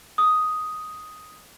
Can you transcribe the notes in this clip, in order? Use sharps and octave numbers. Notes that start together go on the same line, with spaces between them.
D#6